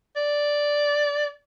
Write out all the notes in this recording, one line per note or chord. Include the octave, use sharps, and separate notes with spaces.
D5